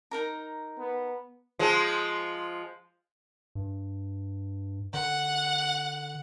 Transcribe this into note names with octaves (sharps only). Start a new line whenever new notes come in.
D#4 A#4 A#5
B3
F3 G#3
G2
D3 F#5